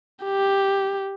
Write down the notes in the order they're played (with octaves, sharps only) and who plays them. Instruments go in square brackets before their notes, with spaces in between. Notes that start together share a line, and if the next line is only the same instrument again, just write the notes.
[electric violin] G4